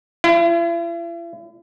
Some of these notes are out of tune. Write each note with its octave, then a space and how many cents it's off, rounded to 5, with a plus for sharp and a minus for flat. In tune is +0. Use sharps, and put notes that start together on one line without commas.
E4 +45